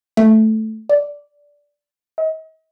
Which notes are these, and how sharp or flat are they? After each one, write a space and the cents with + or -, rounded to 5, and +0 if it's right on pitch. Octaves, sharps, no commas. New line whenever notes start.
A3 -5
D5 -15
D#5 +35